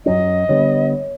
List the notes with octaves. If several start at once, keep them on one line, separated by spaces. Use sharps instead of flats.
F#2 F#3 C#4 D#5
D3 G3 B3 C#5